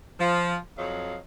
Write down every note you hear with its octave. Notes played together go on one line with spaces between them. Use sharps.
F3
F2 F#3 D#5 F5